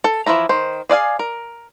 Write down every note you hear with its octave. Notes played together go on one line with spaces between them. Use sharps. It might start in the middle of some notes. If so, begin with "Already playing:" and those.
A4
E3 F3 E4 A#5
D#3 C5
G#4 D5 F5 G#5
A#4